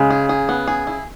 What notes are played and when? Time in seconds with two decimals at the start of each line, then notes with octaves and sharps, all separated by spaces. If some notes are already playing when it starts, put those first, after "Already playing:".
Already playing: C#3 G#3
0.10 G#4
0.29 G#4
0.49 B3
0.67 G#4
0.87 E4